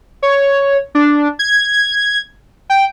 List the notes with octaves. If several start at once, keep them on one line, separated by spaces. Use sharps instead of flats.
C#5
D4
G#6
G5